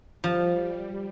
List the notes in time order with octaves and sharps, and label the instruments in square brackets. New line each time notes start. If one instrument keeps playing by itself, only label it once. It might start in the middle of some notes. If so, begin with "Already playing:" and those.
[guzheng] F3 [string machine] G3